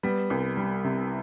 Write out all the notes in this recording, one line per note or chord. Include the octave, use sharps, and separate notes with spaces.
G3 B3
C2
G3
C3